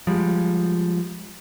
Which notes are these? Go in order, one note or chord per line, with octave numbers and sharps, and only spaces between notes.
F3 G3 G#3